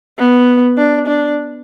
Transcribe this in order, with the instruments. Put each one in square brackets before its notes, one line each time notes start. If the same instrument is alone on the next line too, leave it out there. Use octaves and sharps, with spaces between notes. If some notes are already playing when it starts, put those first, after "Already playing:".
[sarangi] B3
D4
D4